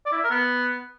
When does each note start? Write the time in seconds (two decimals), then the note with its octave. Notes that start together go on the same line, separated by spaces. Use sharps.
0.06 D5
0.12 E4
0.18 E5
0.24 A#4
0.30 B3